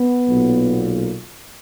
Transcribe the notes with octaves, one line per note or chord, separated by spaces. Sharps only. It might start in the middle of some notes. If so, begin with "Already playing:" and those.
Already playing: B3
B1 A#2